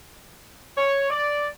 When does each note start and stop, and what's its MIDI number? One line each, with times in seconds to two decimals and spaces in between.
0.77 1.09 73
1.11 1.47 74